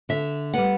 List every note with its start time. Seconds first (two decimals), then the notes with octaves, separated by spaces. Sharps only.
0.09 D3 E5
0.54 G3 B3 F#5